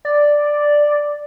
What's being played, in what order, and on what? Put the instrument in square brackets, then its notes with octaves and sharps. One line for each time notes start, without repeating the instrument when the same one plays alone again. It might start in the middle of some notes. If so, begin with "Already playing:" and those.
[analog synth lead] D5